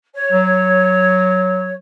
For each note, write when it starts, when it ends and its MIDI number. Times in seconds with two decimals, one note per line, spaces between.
0.14 1.73 73
0.32 1.76 54